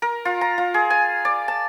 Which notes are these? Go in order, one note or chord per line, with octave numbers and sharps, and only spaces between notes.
A#4
F4
A#5
F4
G#4
G#5
D5
A5